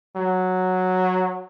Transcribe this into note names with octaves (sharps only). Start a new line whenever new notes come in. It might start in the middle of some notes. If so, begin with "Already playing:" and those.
F#3